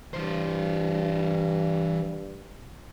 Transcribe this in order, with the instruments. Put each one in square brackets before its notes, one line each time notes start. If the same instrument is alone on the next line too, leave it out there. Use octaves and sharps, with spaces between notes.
[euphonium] G2 [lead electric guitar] E3 C5